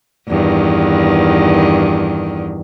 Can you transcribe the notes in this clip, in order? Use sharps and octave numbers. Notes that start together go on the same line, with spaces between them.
E2 G2 D#3